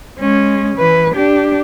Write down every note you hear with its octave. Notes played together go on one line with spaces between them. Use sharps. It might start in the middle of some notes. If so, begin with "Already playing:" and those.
G#3 C#4
E3 B4
D4 G4